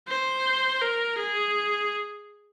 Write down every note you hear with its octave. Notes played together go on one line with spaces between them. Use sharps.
C5
A#4
G#4